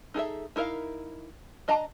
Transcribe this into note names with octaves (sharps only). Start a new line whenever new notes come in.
D#4 G#4 A4 E5
D#4 E4 A#4 E5 F5
D4 D#5 A5 A#5